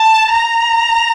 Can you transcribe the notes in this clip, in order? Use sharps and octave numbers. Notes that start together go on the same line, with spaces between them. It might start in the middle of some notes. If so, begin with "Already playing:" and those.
Already playing: A5
A#5